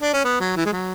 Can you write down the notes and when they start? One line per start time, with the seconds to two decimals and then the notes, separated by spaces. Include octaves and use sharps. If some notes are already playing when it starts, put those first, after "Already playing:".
0.02 D4
0.13 C#4
0.24 B3
0.40 F#3
0.56 E3
0.66 G#3
0.72 F#3